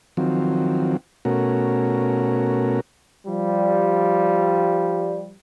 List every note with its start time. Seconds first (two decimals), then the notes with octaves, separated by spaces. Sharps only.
0.17 D#3 F3 F#3 C4
1.25 B2 A3 C#4 F#4 A#4
3.26 F3 G3